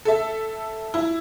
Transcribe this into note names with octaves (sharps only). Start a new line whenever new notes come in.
A4 E5
E4